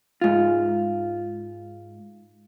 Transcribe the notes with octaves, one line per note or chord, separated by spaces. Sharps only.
G#2 F4